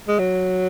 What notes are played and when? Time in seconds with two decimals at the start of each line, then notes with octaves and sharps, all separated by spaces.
0.08 G#3
0.19 F#3